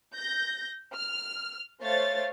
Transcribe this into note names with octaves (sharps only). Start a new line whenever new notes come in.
G6 A#6
F6
A3 C5 C#5 F5 A6